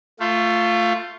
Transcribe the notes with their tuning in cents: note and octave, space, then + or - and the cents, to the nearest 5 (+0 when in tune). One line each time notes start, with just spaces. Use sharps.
A3 +20 F4 +0